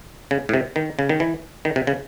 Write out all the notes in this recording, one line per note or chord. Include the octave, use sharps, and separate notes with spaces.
C#3
A2
C3
D#3
C#3
D#3
E3
D#3
C3
C#3